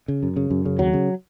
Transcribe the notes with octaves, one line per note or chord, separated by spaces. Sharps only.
C#3
F#2
C#3
F#2
C#3
D#2 F#3
C#3